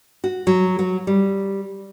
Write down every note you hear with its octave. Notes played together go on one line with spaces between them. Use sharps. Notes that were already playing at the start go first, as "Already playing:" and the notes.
F#4
F#3
F#3
G3